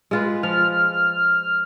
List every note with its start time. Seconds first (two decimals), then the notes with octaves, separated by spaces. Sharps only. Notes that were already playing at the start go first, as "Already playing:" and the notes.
0.11 G#3 F4 B4
0.43 F3 F6